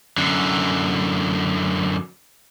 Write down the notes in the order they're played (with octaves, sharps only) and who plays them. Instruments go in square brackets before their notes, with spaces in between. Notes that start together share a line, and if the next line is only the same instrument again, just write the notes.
[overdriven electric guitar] F#2 D3